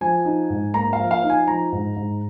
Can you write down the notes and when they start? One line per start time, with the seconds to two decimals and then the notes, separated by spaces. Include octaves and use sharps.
0.01 F3 G#5
0.25 D#4
0.50 G#2
0.74 A#3 A#5
0.93 F5
0.99 F3
1.11 F5
1.23 D#4
1.30 G#5
1.48 F3 A#5
1.72 G#2
1.96 G#2